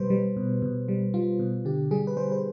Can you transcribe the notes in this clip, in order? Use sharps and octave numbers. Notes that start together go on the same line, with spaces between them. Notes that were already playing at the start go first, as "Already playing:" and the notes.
Already playing: B2 G3 B4 C5
G3
B2
B2
G3
G3 F4
B2
D3 G4
G3 G#4
B4
G3 C5
C5